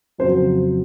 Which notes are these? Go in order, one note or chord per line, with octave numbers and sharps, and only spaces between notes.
F2 C#3 F#3 C5